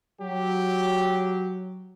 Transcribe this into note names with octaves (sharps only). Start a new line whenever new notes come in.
F#3 G4